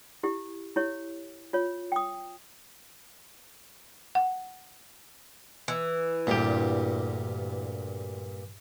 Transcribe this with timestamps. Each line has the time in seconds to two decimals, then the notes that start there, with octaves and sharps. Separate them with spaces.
0.23 E4 G4
0.76 E4 G4 C#5
1.53 F4 C#5
1.92 G5 D#6
4.15 F#5
5.68 E3
6.27 D2 G2 A#2 G4